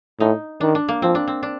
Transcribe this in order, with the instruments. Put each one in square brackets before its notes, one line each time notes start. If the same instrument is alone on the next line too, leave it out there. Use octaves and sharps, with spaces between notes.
[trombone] A2 [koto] D#4
[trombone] D#3 [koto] D4
[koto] D4
A#3
[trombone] F3 [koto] C4
[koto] D4
C4
D4